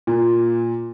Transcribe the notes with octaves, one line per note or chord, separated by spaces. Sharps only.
A#2